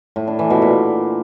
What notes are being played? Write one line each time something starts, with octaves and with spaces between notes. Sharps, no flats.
A2
D4
E3
B2
A#2